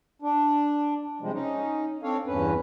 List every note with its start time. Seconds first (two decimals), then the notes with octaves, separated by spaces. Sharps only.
0.22 D4
1.21 C3 F3 G3 G#3
1.33 C#4 D#4
2.03 C4 D4 A4 C#5 F5
2.27 E2 G2 C#4 B4